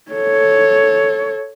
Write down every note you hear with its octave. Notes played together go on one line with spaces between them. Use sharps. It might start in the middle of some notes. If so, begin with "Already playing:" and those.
A4 C#5